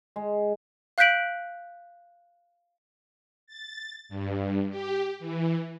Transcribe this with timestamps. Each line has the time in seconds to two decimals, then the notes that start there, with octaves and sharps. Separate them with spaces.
0.16 G#3
0.98 F5 F#6 G6 B6 D7 F#7
3.47 A6
4.09 G2
4.70 G4
5.20 E3